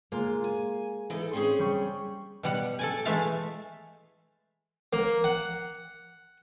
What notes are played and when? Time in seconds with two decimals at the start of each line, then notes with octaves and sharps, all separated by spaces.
0.12 G#3 A#3 F4
0.44 G#5
1.10 E3 D#4 A4
1.33 C4 C#4 G#4
1.59 G3 G5 C#6
2.43 B2 G3 F#5
2.79 A4 D5 G#5
3.05 E3 G#3 A3 E5 F5 A5
4.93 A#3
5.24 F#5